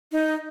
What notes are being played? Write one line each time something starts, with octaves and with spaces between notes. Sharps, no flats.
D#4